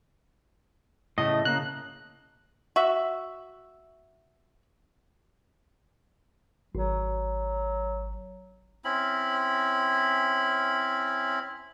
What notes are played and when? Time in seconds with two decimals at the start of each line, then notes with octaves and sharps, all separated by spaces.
1.18 A2 C#3 A3 D#5
1.45 C#3 A#3 F#6
2.76 F#4 E5
6.75 G#1 F#3
8.85 C4 C#4 E4 B5